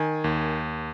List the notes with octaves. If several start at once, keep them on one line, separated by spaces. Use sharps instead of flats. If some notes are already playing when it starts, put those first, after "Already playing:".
Already playing: D#3 G#5
D#2